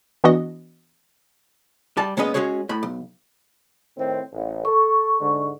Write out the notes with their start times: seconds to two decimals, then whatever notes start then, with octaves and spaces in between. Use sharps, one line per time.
0.24 E3 B3 D4 F#4 D#5
1.97 G3 A5
2.17 A#2 G#3 B3 C#4 B4 D#5
2.34 G#3 C#4 F#4 G#4 C#5
2.69 A2 B5
2.83 B1
3.97 A2 D#3 C4
4.33 A1
4.65 A4 C#6
5.20 G#2 D3